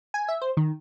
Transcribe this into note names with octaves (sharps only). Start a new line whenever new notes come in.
G#5
E5
C5
D#3